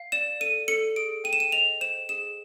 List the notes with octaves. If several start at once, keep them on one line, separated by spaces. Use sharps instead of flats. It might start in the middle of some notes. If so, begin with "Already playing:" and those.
Already playing: F5
D5 E7
A4 D#7
A4 C#7
G#4 D7
G5 D#7
E7
D#7
D#5 F7
C5 E7
G#4 E7